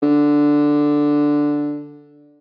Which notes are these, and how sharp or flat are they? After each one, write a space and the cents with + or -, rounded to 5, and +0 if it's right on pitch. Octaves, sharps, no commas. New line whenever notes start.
D3 +0